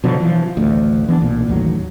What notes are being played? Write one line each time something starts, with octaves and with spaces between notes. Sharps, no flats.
B2 D3 F3 F#3
E3 F3
A1 D2
E3 B3 D4
B1 A#2
A1 D#2 F#3